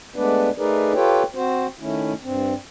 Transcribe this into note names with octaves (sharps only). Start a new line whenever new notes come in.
G#3 A3 B3 D4 B4 D5
A3 D#4 G#4 A#4 B4 D5
F4 G4 A4 B4 C#5 G5
C4 F#4 C5
D#3 A3 C#4 E4
G2 C4